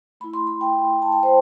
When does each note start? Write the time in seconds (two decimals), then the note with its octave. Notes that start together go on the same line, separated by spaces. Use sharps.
0.20 A3 E4 B5
0.34 C6
0.47 B5
0.61 G5
1.02 A5
1.12 G5
1.23 C5